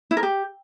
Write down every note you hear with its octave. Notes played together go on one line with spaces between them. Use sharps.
E4
A#4
G4